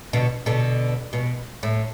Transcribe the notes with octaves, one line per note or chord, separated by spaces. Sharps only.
B2 D3
B2 D3
B2
A2